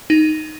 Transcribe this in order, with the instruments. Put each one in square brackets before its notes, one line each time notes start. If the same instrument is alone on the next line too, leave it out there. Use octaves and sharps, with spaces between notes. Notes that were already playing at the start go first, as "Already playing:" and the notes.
[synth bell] D#4